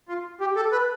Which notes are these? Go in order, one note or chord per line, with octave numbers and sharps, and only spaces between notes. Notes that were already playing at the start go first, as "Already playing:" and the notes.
F4
G4
A4
B4